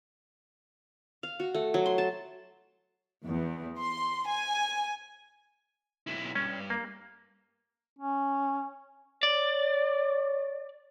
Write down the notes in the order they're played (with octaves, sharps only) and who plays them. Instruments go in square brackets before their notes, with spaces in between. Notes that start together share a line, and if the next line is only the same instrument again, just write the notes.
[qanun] F5
F#4
A3
F#3
C6
A5
[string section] E2
C6
G#5
[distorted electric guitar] B1 E4
[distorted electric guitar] G2 [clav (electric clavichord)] C#4
[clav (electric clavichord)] A#3
[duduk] C#4
[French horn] C#5 [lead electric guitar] D5